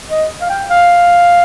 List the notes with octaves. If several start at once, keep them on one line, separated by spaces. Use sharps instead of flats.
D#5
F5
G5
F5